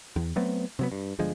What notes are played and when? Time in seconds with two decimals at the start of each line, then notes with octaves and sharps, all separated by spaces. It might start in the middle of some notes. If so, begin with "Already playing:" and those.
0.16 E2
0.36 F#3 A3 B3 C4
0.79 C3 F#3 B3
0.92 G2
1.19 G1 D3 F3 G#3